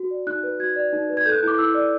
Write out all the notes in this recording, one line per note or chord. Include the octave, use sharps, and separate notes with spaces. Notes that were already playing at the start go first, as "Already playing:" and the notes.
Already playing: F#4
D5
D#4 F#6
B4
F#4 G#6
D5
D#4
B4
G#6
A4 G6
F#6
G6
E4 D6
E4 E6
D5